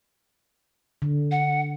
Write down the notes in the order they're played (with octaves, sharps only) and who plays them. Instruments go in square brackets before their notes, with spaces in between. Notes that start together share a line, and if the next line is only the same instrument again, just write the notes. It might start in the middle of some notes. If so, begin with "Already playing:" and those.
[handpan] D3
[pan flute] F#5